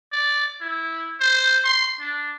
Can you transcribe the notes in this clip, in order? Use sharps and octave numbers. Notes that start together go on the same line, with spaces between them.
D5
E4
C5
C6
D4